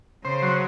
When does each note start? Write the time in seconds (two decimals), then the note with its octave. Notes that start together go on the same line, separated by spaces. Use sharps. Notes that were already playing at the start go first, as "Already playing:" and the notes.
0.25 C#3 C5
0.42 F#3